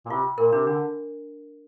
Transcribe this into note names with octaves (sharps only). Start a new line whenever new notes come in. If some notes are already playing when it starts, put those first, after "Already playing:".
A#2
C3 F4
A#2 A#4
C3 D4
D3 D4